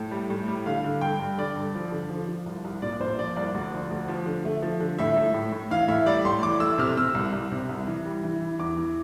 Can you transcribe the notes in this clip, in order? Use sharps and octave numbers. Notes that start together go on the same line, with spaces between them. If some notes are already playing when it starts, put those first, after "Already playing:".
Already playing: A2
G3
A2
G3
D3 F5
D3
G2 G5
G2
D3 D5
G2
F3
D3
F3
F3
C2
C2
A#2 D5
A#2 C5
F3 D5
C2 D5
D2 D5
F3
D2
F3
D3
A3
F3
D3
A2 E5
A2
A2
A2
E3 F5
A2 E5
G3 D5
A2 C6
E3 D6
A3 E6
C3 F6
C3 E6
C2
C2
C3
C2
E3
G3
E3
E3
E2 D6
E3